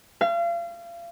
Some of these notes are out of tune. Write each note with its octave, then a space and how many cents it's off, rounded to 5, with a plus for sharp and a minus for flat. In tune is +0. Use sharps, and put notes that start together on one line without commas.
F5 -35